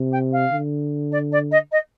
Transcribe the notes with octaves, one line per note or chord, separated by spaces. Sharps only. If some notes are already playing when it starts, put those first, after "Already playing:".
Already playing: C3
G5
F5
D3
D5
D5
D#5
D#5